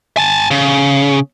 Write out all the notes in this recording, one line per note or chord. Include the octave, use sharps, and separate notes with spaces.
G#5 A5
C#3